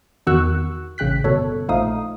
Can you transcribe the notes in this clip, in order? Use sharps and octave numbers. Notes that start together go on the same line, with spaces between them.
E2 D#3 F#4 C#6 E6 F#6
A1 C#3 G5 F#6 B6
G1 B2 A4 C#5
A#1 F3 A3 D#4 F5 D#6